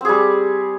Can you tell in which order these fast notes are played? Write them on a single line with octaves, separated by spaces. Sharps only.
C4 G#4 G3